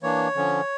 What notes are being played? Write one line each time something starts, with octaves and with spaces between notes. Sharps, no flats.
E3 A#3 D4 C#5
D3 F3 C#4